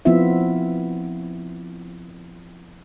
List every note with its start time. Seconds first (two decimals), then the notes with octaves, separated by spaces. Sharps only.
0.05 F3 B3 C4 E4 F4 E5